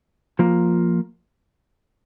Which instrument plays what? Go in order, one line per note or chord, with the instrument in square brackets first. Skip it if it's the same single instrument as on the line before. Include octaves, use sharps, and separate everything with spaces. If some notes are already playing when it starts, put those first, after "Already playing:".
[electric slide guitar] F3 A#3 F4